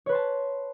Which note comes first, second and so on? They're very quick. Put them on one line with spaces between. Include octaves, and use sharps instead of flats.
C#5 B4 C6 A5